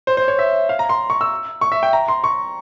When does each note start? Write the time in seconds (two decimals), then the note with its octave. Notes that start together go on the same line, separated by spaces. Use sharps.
0.07 C5
0.17 C5
0.28 C#5
0.39 E5
0.69 F5
0.79 A#5
0.89 C6
1.10 C#6
1.21 E6
1.61 C#6
1.72 E5
1.83 G5
1.93 A#5
2.08 C6
2.24 C#6